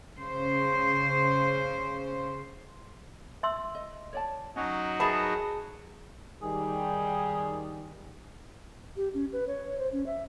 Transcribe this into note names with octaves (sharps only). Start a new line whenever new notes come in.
C#3 C5
E5 C6 E6
D#5
C#5 D5 A5
F#3 C#4 D#4 F#4
G#4 A#4 B4 E5 A5 B5
D#3 G3 G#4
G4
C#4
B4
C#5
C5
C#4
E5